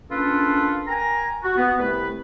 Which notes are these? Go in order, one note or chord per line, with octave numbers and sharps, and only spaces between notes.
A#3 C#4 D4 F4 A4 B4
A#4 G5 G#5 A#5
F#4
B3
C2 A3 C4 B4